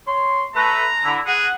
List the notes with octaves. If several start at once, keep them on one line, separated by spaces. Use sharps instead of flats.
C#5 C6
A3 A4 B4 A#5
D3 E4
G#4 F#5